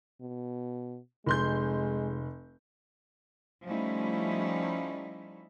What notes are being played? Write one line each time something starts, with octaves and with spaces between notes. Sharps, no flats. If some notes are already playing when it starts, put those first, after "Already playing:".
B2
F1 G#3 C6 G6
F3 G3 A3 C#4 D#4 E4